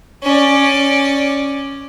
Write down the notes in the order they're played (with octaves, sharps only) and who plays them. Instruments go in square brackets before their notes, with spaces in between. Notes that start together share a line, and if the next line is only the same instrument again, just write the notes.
[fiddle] C#4 D5